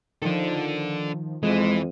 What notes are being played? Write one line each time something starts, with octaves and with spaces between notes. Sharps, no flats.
D#3 F3 D4 A4
F2 E3 G#3